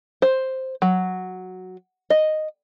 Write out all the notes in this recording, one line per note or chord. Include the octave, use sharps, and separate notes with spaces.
C5
F#3
D#5